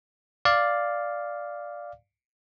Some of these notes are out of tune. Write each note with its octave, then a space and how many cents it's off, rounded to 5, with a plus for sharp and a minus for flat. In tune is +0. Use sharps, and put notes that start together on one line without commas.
D5 +0 F5 +0